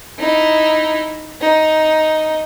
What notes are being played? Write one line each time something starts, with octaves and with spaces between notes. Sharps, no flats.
D#4 E4
D#4